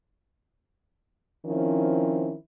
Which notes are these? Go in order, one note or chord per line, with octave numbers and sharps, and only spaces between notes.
D#3 F3 C4 C#4 E4